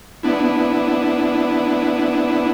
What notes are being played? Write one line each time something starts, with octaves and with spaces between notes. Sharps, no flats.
B3 D4 E4